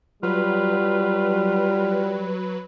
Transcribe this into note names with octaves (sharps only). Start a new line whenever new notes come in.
F#3 G3 F4 B4